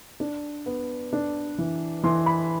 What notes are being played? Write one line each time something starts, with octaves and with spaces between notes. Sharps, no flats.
D4
B3
D4
E3
E3 C6
B5